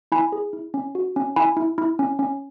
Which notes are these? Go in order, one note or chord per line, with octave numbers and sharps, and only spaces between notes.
E4 G#5 B5
G#4
E4
C#4
F#4
C#4
E4 G#5 B5
E4
E4
C#4
C#4